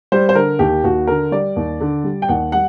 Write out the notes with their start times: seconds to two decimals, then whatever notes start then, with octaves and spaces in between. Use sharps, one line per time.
0.12 G3 C5
0.29 C5
0.35 D3 A#4
0.59 D#2 G4
0.84 D#2 F#4
1.07 D3 A#4
1.32 G3 D5
1.56 D#2
1.80 D3
2.04 G3
2.22 G5
2.29 D#2 F#5
2.52 G3 F#5